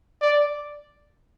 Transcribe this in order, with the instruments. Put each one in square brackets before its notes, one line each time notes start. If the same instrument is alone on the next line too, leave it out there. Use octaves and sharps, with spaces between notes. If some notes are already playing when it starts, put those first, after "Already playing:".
[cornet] D5